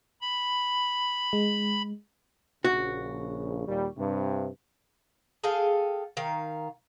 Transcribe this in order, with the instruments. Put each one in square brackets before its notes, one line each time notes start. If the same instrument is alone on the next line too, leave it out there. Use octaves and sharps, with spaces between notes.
[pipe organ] B5
[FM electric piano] G#3
[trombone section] A#1 C#3 [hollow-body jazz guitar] F#4
[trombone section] D#2 A#2 G3
G2 C3
[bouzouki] G#4 A4 F5 G5
D#3 F5